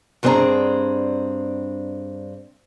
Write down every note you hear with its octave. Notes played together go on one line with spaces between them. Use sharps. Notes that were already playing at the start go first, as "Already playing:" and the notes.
G2 F#3 C4 D4 G#4 A#5